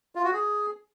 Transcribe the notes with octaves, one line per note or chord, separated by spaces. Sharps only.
F4
F#4
G#4